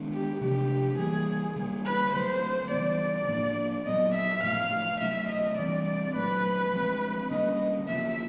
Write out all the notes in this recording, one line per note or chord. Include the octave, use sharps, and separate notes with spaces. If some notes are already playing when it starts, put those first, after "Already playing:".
Already playing: D#3 G#3 B3 D4
G4
C3 F3 A3 D4 G4
E3 G3 A#3 G#4
D3 G3 A#3
B4
D3 F#3 A3 C5
C#3 E3 G3 B3 D5
A2 F3 A#3 D4
A#2 F#3 B3 D#5
E5
A2 F3 A3 F5
B2 F#3 A3 E5
D#5
E3 G3 C4 D5
A#2 F#3 A3 B4
F3 G#3 C4
D3 G3 A#3 C#4 D#5
C#3 F3 A#3 E5